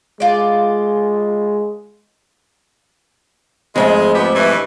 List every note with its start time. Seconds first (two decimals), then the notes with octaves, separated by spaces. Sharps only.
0.20 G#3 F4 D5
3.76 F2 G#2 G#3 A3
4.15 F3 B3 G4
4.35 G2 E3